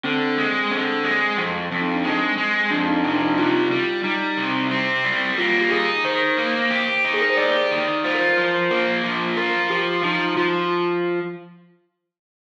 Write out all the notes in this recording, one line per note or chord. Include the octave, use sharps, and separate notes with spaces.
D3 C4
G#3
D3 C4
G#3
F2 C4
F2
D#4
D4
G#3 C4
G#3
F2 D4
D#4
C3 C4
D4
D#4
G3 F4
G3
G3 D#4
C3
C4
G3
A#3 F4
G4
D#4 G#4
D#3 C5
A#3
G4
D#4
G#4
A#4
C5
G4 D5
D#3
F4 C5
A#4
C5
A#4
F3 C5
C5
A#3 A#4
F3
F4 A#4
F3 G4
F3 D#4
F3 F4